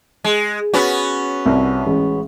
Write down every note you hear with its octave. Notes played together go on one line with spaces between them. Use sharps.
G#3
B3 C#4 F#4
C2
A1 G#3